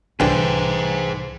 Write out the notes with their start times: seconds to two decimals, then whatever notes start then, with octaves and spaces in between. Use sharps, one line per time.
0.20 C2 D3 E3 G#4 C5 G5